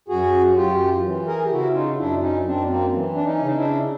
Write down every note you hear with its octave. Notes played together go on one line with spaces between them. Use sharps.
F#2 F#4 G#4
F#2 F4 G4
E3
G#4 A#4
G4
C#3 E4 F#4
D#4 F4
F#2 D4 E4
C#4 D#4
F#2 C4 D4
A#3 C4
E3
D4
C#4 D#4
C#3
D#4
D4 E4